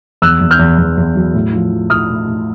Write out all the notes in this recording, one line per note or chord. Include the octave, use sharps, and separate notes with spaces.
E2 E6 F#6
E2
F6 G6
E2
E2
E2
F#3
A2
F3
F3
A2 D#6 F6
A2
A2